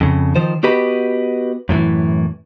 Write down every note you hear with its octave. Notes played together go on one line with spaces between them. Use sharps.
F2 C#3
D#3 F3 C5
B3 F#4 G4 B4 D#5 B5
F#2 A2 D3 E3